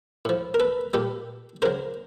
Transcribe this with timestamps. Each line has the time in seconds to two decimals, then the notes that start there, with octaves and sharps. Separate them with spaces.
0.25 A2 F3
0.54 A#4
0.60 A4 B4
0.94 A#2 G3 G4 A4
1.62 C#3 F#3 A#4 C5